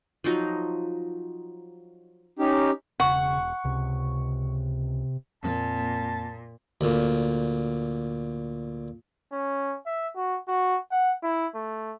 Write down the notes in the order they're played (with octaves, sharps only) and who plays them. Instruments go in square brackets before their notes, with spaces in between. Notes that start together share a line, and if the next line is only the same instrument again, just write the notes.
[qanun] F3 F#3 D#4
[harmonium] C#4 D#4 G4
[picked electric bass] E1 [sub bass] C#3 [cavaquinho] F#5 [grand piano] C#6
[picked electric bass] C#2 [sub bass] C3
[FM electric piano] F2 A#3 C4 [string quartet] A#2 [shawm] A5
[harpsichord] D2 A#2
[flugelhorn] C#4
E5
F#4
F#4
F#5
E4
A3